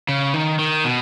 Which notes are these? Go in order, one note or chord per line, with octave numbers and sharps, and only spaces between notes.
C#3
D#3
D#3
B2